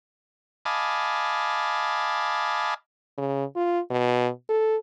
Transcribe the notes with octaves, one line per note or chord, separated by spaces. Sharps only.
D#5 F5 G#5 A5 B5 D6
C#3
F4
B2
A4